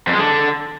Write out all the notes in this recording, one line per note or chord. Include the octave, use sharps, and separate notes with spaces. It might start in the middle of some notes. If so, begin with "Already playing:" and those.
F2
G#3
D3